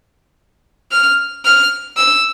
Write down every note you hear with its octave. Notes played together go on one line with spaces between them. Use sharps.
F6
F6
E6